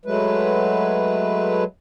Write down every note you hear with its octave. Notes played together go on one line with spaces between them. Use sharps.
F#3 G#3 A3 B4